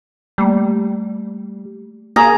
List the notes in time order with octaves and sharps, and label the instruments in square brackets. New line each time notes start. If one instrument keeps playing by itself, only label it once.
[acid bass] G3 [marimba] A3 A#3
[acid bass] A#3 [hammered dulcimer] G#4 A#5